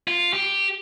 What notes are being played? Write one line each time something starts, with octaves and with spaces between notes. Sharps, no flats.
F4
G4